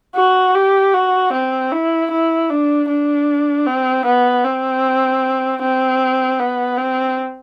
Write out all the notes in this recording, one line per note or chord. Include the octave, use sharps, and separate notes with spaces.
F#4
G4
F#4
C4
E4
E4
D4
D4
C4
B3
C4
C4
B3
C4